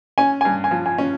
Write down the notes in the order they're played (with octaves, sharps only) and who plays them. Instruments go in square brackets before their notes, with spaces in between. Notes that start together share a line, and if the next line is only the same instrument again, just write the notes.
[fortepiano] C#4 [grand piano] G#5
[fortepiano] G2 [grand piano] G#5
[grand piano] G#5
[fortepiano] F3
[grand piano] G#5
[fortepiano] C#4